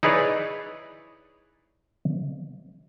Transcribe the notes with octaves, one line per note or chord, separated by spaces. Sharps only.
D#4 E4 G#4 B4 C#5 D5